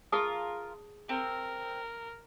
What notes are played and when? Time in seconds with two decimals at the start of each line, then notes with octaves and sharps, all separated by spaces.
0.12 F4 G#4 A#4 A5 D#6
1.09 C4 A#4